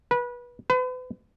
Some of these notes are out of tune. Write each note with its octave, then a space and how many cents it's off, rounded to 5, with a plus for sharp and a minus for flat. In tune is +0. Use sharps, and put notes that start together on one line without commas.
B4 -25
B4 +40